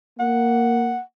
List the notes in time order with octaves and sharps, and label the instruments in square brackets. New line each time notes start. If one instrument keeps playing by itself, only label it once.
[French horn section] A#3 [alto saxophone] F#5